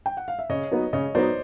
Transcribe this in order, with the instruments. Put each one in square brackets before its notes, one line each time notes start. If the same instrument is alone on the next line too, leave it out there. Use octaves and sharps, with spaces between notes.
[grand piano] G5
F#5
F5
E5
[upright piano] C#3 [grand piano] C#5 D#5
[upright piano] F#3 B3 D#4
[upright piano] C#3 [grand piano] C#5 D#5
[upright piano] F#3 B3 D#4 [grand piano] C5 D5